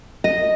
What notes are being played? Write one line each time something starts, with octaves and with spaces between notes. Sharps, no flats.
D#5